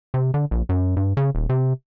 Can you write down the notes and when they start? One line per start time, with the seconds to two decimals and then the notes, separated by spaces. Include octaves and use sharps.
0.14 C3
0.34 D3
0.51 A#1
0.69 F#2
0.97 G2
1.17 C#3
1.35 D#1
1.49 C3